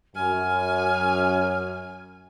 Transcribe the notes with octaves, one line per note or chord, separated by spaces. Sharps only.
F#2 G#5 F6